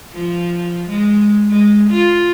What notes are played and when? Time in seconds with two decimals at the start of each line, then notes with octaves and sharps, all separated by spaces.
0.13 F3
0.89 G#3
1.50 G#3
1.90 F4